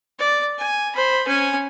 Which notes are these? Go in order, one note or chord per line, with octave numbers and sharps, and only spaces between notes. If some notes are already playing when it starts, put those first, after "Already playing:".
D5
G#5
C5 B5
C#4 G#5